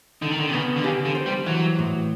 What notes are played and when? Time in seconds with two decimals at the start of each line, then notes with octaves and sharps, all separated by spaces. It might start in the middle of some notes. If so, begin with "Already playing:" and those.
0.22 D3 D#4
0.31 D#3
0.40 D3
0.48 C3
0.53 C#3 B3
0.76 D3
0.84 C#3 G4
1.05 D3
1.15 C5
1.26 G3
1.46 E3 F#3
1.79 A2